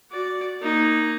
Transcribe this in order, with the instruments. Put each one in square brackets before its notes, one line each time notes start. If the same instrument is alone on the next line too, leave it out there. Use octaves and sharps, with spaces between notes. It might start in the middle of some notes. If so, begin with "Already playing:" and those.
[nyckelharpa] F#4 D5
A#3 D#4